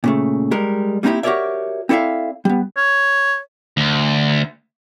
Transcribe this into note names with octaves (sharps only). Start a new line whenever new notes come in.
A#2 C#3 A3
G3 G#3 A#4
G3 A#3 C4 D#4 E4 G4
F#4 G4 A#4 C#5 D5 E5
C4 E4 A4 D5 E5 F5
G3 B3
C#5
D2